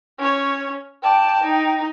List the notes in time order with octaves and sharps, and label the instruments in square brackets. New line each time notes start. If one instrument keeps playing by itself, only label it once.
[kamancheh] C#4 C#5
[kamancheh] D5 A5 [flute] G5
[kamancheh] D#4